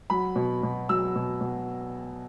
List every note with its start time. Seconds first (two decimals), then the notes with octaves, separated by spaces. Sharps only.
0.10 F#3 B5
0.36 B2
0.63 B2
0.89 F#3 E6
1.16 B2
1.41 B2